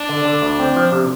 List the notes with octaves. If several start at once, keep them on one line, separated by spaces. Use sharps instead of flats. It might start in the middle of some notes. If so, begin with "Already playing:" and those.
Already playing: D4
D3
D3
D2
C4
F3
C3